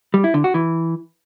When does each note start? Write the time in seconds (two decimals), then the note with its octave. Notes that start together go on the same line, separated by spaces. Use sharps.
0.14 G3
0.24 E4
0.34 D3
0.44 F#4
0.54 E3